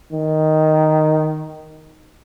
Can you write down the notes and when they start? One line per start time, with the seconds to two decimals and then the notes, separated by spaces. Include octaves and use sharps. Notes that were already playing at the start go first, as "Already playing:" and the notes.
0.12 D#3